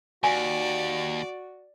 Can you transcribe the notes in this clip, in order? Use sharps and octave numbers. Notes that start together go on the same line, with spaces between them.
D#2 F#4 D5 G#5